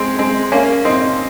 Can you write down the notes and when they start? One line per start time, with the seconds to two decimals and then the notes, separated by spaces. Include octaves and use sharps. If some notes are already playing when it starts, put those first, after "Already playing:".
Already playing: G#3 C4
0.19 G#3 C4
0.52 A#3 C#4
0.85 C4 D#4